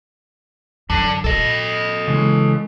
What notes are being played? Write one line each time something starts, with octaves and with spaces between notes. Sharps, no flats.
F#2 D3
A#2 A4 D#5
C#3 E3 G#3